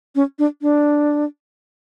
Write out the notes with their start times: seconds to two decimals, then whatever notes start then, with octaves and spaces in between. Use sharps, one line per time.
0.15 C#4
0.39 D4
0.62 D4